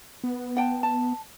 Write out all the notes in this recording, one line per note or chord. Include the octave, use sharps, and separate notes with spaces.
B3
F#5 G5 A5
A5